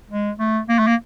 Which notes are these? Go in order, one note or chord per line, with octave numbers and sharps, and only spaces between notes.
G#3
A3
A#3
A3
A#3